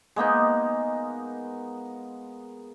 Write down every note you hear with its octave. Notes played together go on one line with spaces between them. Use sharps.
G#3 A#3 B3 D#4